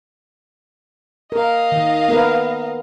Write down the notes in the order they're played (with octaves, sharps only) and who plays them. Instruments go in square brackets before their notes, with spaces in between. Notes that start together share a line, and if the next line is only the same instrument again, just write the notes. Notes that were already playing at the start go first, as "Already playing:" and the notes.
[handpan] A#4 [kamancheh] D#5 F5
[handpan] D#3
B3 A#4 B4